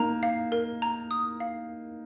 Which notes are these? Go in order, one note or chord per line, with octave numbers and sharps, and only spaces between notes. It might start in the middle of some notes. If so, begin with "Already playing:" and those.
Already playing: A#3 D#4 A#5
F5
A#4
A#5
D#6
F5